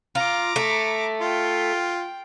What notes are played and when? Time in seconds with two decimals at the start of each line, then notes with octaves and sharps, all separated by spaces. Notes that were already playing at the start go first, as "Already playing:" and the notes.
0.15 F4 A#5 D6
0.56 A3
1.21 F4 G5